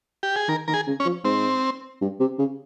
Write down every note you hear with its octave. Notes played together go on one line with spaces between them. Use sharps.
G4
G#4
D#3 A#4
D#3 A#4
G#4
C#3
C#4
F3
G#2 C4
G2
C3
C#3